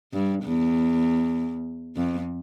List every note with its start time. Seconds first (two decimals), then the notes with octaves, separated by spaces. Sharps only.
0.13 G2
0.43 E2
1.97 F2